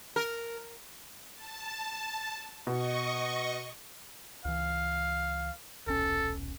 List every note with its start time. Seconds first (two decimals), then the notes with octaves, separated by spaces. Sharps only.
0.16 A#4
1.34 A5
2.67 B2 D#5 C#6
4.45 C#2 E3 F5
5.87 D#1 B1 C#4 A4